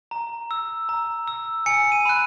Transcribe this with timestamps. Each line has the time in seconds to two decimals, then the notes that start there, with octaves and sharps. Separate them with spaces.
0.11 A#5
0.51 E6
0.89 A#5
1.28 E6
1.66 G#5 C#7
1.92 D#7
2.05 B5 F#6